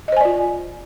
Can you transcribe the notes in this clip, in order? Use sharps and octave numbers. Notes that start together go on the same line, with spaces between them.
F4 C5 D5 D#5 G#5